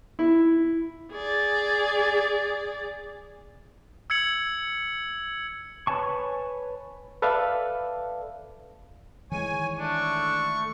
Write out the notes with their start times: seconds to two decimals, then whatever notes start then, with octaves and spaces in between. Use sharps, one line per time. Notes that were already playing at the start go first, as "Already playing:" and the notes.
0.19 E4
1.12 G#4 D5
4.10 E6 G#6 C#7 F#7
5.87 B4 C#5 G#5 A5 C#6
7.22 A4 B4 D5 E5 F5 A5
9.32 D#3 E3 G#3 C#5 G#5
9.79 A3 D4 C#6